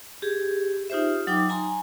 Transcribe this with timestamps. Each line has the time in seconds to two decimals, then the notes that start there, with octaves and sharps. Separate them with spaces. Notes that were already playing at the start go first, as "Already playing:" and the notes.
0.22 G4 G#4
0.90 D#4 F4 G4 C5 E5
1.27 F#3 D#4 G5 D6
1.50 G#5 A#5 C6